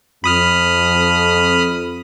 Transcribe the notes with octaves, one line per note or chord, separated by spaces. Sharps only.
F2 B5 D#6 F6